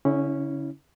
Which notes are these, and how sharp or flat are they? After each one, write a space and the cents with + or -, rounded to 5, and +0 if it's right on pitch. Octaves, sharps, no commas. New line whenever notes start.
D3 -45 C#4 +0 E4 -25